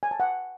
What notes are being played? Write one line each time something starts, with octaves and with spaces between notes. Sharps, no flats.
G#5
A5
F#5